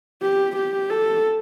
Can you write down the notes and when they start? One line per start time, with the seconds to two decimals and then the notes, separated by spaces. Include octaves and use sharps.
0.22 G4
0.56 G4
0.90 A4